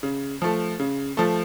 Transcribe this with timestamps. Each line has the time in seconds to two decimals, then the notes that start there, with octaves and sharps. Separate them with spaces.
0.03 C#3
0.42 F3 A3
0.80 C#3
1.17 F3 A3